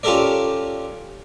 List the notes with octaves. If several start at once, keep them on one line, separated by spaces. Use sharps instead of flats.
C#4 F4 G4 A4 A#4 D5